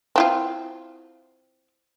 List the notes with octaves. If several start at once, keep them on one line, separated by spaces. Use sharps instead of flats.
C4 E4 F4